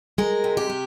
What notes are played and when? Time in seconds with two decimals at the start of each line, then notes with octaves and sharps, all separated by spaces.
0.18 G#3 A#4
0.44 C3
0.57 G4
0.70 G#3